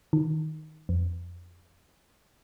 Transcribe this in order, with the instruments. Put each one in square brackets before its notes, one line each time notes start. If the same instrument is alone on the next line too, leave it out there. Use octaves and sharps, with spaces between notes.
[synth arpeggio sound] D#3
F2